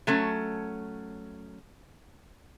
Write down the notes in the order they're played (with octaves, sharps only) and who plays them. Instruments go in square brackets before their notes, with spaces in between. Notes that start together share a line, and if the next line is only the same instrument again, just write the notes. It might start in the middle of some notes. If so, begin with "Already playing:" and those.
[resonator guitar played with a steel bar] F#3 A3 C#4